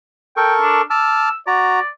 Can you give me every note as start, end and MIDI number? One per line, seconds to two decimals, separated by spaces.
0.37 0.82 69
0.37 0.82 70
0.37 0.53 79
0.37 0.82 85
0.61 0.82 62
0.90 1.29 81
0.90 1.29 86
0.90 1.36 88
0.90 1.29 89
1.47 1.79 66
1.47 1.88 74
1.47 1.79 82